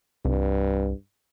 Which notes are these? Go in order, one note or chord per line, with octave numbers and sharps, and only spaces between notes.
C2 G2